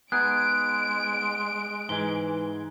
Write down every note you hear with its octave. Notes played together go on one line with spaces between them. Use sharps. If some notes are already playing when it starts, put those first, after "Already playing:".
G#3 B3 D#4 G#4 F#6 D7
G#2 E3 G#3 G7